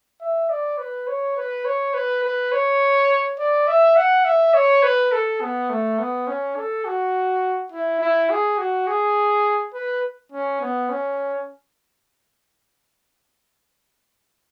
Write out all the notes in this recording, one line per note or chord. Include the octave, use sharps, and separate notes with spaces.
E5
D5
B4
C#5
B4
C#5
B4
B4
C#5
D5
E5
F#5
E5
C#5
B4
A4
B3
A3
B3
C#4
A4
F#4
E4
E4
G#4
F#4
G#4
B4
C#4
B3
C#4